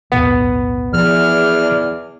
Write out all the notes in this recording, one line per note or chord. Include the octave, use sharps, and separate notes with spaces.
D1 B1 E2 B3
E2 F3 G#4 D5 F6